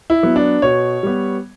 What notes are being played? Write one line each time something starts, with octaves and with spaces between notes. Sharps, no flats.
E4
F#3 B3
D4
B2 C#5
G3 B3